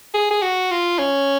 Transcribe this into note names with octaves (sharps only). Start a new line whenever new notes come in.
G#4
G#4
F#4
F4
C#4